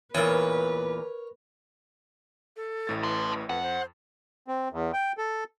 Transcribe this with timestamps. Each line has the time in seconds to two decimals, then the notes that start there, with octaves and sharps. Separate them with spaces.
0.15 E2 A#2 A#4 B4 C#5
2.56 A4
2.87 A1 A2 A6
3.03 B4 A5 C6
3.49 F2 B4 F#5
3.63 C5
4.48 C4
4.72 E2
4.93 G5
5.18 A4